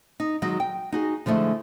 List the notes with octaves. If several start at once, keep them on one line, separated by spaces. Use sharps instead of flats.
D#4
D#3 F#3 G#3 D#4
G5
D#4 F#4 G#4
D3 F3 G#3 A3 E4